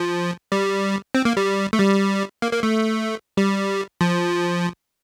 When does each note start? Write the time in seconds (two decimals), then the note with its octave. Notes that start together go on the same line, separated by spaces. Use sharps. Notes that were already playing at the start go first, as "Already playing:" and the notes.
Already playing: F3
0.52 G3
1.15 C4
1.25 A#3
1.37 G3
1.73 A3
1.79 G3
2.42 A#3
2.52 A#3
2.63 A3
3.37 G3
4.01 F3